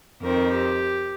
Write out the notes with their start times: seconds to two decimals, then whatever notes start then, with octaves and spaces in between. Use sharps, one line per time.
0.21 F2 D#3 C4 A#4
0.51 G4